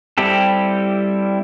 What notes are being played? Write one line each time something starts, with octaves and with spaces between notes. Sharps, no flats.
G3 C4 E4 G4 A4